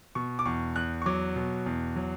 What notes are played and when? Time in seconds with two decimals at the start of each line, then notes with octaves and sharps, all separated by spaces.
0.15 B2 C#6
0.39 D6
0.46 E2 C#6
0.76 E2 F#6
1.02 C#6
1.06 F#3 D6
1.36 B2
1.66 E2
1.96 F#3